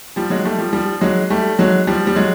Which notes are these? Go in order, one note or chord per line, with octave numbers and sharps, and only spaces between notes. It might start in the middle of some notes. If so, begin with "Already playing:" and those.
F3 G3
F#3 G#3
G3 A3
F3 G3
F3 G3
F#3 G#3
G3 A3
F#3 G#3
F3 G3
G3
F#3 G#3